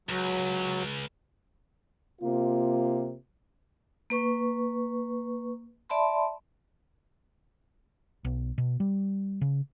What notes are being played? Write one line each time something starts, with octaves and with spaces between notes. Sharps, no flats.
C#2 F#3
C3 A#3 F4
A#3 B4 C#6
D5 E5 A5 B5 C6
B1
B2
G3
C#3